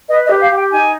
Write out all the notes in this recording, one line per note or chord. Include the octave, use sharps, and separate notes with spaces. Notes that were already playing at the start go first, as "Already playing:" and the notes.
B4 D#5
D#5
G4
F5
G4 G5
D#4 G#5